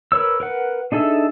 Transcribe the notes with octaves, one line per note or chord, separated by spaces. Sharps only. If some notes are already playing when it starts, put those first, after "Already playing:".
A#4 B4 C#5 E6
A#4 B4 F#5
D4 D#4 G#4 A4 E5